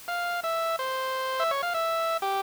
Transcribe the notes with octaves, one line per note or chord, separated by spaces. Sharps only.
F5
E5
C5
E5
C#5
F5
E5
G4